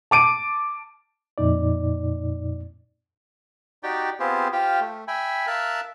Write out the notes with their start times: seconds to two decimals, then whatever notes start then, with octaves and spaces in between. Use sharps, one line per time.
0.11 A5 D6 D7 D#7
1.38 F2 A#2 D#4 D5
3.83 D#4 F#4 G4 D5 G5
4.20 B3 C4 F4 G4 G#4 C5
4.53 F4 G4 C5 F5 G5
4.81 A3
5.08 E5 G5 G#5 B5
5.47 A#4 E5 F5 A5 E6 F#6